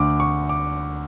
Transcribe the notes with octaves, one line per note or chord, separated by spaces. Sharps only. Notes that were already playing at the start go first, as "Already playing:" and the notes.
Already playing: D2 D3 D6
C#6
D6